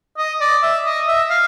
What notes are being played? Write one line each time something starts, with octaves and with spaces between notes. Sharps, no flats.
D#5
D5
E5
D#5
E5
F5